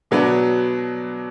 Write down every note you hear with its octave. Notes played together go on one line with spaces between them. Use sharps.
B2 F#3 B3 D4